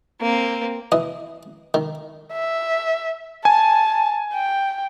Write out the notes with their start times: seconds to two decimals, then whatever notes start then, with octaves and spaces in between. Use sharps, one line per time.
0.21 A#3 C4
0.92 E3 D#5 D#6
1.74 D#3
2.33 E5
3.45 G#5 A5
4.34 G5